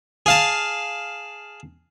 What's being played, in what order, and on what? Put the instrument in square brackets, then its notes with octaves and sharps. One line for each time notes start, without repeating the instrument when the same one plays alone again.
[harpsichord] G#4 F5 A5